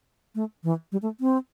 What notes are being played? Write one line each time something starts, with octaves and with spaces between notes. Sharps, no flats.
A3
E3
G3
A3
C4